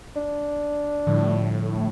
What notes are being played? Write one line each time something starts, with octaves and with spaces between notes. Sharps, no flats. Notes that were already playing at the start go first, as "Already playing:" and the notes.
D4
A2 D3 F3 G3